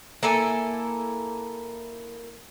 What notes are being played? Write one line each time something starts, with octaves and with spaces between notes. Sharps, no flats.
A#3 E4 A4 G#5